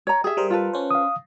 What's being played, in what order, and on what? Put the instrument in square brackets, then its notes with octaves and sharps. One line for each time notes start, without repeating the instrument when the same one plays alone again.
[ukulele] C#5 A#5
[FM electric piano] G4 [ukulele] G#4 E5
[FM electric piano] G3 A#4 C5
[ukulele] F4 A4 B4
[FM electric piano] C#4 C5
[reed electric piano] F5 D#6